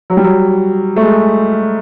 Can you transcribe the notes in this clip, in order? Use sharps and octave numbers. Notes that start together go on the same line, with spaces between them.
F#3
G3
F#3
A3
G#3